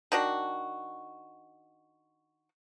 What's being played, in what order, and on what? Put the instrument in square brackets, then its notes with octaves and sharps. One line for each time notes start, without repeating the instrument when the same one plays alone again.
[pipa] D#3 D4 F#4